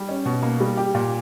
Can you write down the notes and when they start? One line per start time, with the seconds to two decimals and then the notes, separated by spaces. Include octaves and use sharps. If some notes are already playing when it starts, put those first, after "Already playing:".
Already playing: G3
0.09 C#4
0.25 B2
0.43 A#3
0.60 G3
0.77 G4
0.95 A#2